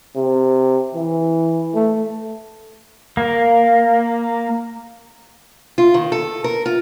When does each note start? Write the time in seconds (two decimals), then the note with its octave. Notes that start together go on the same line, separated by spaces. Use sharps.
0.16 C3
0.94 E3
1.74 A3
3.17 A#3
5.78 F4
5.94 D#3
6.12 A4
6.44 A#4
6.66 F4